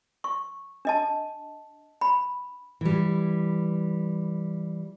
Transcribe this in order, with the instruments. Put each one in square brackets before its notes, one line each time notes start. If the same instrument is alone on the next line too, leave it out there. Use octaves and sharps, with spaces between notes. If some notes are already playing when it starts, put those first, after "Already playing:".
[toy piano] C#6
D4 D#5 A5
B5
[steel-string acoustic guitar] E3 G3